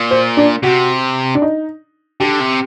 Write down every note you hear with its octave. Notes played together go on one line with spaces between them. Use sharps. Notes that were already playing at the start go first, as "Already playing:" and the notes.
Already playing: A#2
C5
D4
C3 F#4
D4
D#4
D3 G4
C3